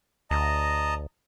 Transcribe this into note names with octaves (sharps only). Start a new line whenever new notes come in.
D2 D#5 A5 A#5